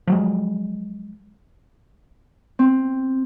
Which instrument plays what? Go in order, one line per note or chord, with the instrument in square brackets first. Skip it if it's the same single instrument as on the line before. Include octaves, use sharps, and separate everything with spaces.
[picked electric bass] F3 F#3 G#3
[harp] C4